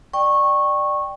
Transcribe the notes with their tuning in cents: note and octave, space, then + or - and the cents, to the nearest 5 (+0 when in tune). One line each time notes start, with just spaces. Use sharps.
D5 +20 G5 +0 C#6 -15